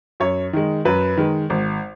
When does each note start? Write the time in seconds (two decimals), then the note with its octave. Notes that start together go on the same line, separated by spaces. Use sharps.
0.20 F#2 C#5
0.53 D#3 G#3
0.85 F#2 B4
1.17 D#3 G#3
1.50 G#1